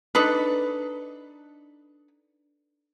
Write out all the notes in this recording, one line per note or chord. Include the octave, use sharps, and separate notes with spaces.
D4 D#4 A4 B4